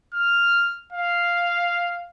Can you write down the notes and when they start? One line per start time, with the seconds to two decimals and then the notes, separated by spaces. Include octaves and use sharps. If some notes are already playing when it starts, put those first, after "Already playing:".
0.14 F6
0.93 F5